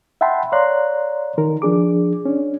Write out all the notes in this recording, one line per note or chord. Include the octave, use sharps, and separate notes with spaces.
E5 F#5 G5 A5 B5 C6
C#5 D5 F5 A#5 C6 F#6
D#3 A#4
F3 D4 G#4 D6
C#4 D4